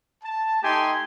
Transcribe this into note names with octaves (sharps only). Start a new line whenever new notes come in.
A5
A3 D#4 G4 G5 G#5 C6